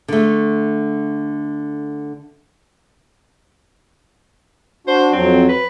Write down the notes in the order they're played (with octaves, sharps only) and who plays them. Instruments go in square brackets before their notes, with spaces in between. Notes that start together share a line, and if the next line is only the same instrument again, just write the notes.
[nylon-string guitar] D3 A3
[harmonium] D4 F#4 [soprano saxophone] C5
[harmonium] F2 F#3 [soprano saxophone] C4
[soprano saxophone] B4